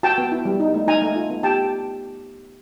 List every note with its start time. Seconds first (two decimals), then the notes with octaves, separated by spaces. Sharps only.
0.03 F#4 G5 A5
0.18 B3
0.32 E4
0.45 G3
0.60 D#4
0.74 A3
0.88 D#4 G#5 A#5
1.02 A3
1.16 F4
1.30 B3
1.43 G4 G5 A5